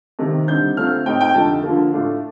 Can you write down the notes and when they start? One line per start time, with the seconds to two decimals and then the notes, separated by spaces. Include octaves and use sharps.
0.19 C3 D#3 A#3 D#4
0.47 D3 G3 C4 D#4 G6
0.77 D3 A3 C4 F4 F6
1.06 A2 A3 C4 D#4 G5
1.21 G5
1.34 F2 D3 A3 D#4 A5
1.63 D3 F3 A#3
1.92 A2 A3 D4 F4